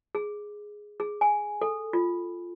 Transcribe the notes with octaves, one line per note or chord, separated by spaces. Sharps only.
G#4
G#4
G#5
A4
F4